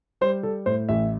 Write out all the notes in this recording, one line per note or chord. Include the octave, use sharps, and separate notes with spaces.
G3 C5
G3 A4
A2 C5
A1 E5